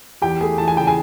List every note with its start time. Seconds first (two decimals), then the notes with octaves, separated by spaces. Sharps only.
0.22 E2 G4 G5
0.41 A3 G#4 G#5
0.58 E3 A5
0.68 G#5
0.77 C#3 G5
0.87 G#4 G#5